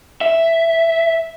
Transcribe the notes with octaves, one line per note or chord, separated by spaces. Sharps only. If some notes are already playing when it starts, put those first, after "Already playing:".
E5